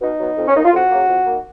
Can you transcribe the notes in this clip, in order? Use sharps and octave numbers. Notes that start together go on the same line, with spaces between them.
B2 D#4
F#3 B3
F2
C#4
D#3 A#3 D#4
F4
F2 F#4
C#3 F#3 A#3
F2
D#3 A#3